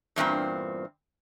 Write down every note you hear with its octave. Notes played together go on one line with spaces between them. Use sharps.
E2 G2 A#2 C4